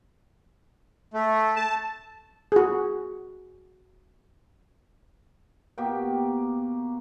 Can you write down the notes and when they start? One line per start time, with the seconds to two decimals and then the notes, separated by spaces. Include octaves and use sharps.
1.14 A3
1.56 A5
2.52 F#4 G#4
5.78 B2 A#3 G4 G5